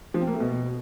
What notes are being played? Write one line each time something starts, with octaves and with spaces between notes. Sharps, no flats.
F3
C4
A#3
A3
B2